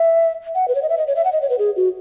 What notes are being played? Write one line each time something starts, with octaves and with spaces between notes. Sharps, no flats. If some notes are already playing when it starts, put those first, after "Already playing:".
Already playing: E5
F#5
B4
C#5
D#5
E5
D#5
C#5
E5
F#5
D#5
C#5
B4
G#4
F#4